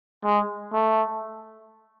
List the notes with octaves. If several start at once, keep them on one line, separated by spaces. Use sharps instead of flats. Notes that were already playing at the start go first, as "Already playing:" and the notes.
G#3
A3